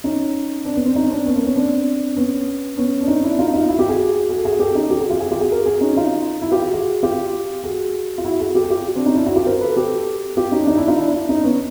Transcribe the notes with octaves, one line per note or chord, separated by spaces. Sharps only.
C#4 D#4
C4 D4
B3 C#4
C4 D4
C#4 D#4
C#4
C4 D4
B3 C#4
A#3 C4
B3 C#4
C4 D4
B3 C#4
B3 C#4
D4
C#4 D#4
D4 E4
D#4 F4
D#4 F4
E4 F#4
F4 G4
F#4 G#4
F#4 G#4
A4
F#4 G#4
G4 A4
C#4 D#4
G4 A4
F#4 G#4
F4 G4
F#4 G#4
F4 G4
F#4 G#4
G#4 A#4
F#4 G#4
C#4 D#4
D#4 F4
E4 F#4
F4 G4
F#4 G#4
F#4 G#4
F4 G4
F#4 G#4
F4
E4 F#4
F#4 G#4
G4 A4
G#4
F4 G4
C4 D4
C#4 D#4
D4 E4
E4 F#4
F4 G4
A#4 C5
A4 B4
G4 A4
F4 G4
C#4 D#4
D4
C#4 D#4
D4 E4
D#4 F4
D4 E4
D4 E4
C#4 D#4
D4
B3 C#4